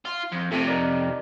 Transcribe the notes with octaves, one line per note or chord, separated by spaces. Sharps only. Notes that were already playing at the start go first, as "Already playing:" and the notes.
F4
F2
F2 C3 F3 A3
D#4 A#4 D5